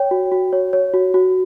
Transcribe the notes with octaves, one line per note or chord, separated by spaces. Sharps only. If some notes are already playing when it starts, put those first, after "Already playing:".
Already playing: C#5 G5
F#4
F#4
C#5
C#5
F#4
F#4